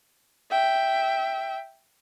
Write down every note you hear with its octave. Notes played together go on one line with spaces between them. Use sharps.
E5 G5